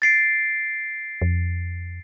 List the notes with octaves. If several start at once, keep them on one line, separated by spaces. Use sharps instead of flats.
A6 C7 D7
F2